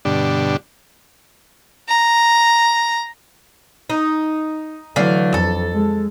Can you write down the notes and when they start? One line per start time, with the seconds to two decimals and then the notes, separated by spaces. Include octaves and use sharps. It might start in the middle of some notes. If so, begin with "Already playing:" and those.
0.05 G2 B2 D3 D4 G4
1.88 A#5
3.90 D#4
4.96 D3 E3 F#3 A3 F5
5.34 F2 A4
5.72 G#3